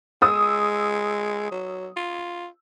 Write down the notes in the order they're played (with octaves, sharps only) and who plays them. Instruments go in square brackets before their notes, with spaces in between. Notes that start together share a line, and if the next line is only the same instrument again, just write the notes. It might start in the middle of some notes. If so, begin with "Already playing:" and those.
[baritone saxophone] G#3 [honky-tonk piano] D#6 E6
[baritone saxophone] F#3
F4